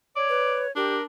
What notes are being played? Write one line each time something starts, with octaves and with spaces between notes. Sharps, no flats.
C#5 D5
B4
D4 G4 A#4